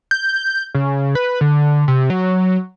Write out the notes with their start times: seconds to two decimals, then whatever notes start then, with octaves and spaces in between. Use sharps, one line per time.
0.11 G6
0.74 C#3
1.15 B4
1.41 D3
1.88 C3
2.10 F#3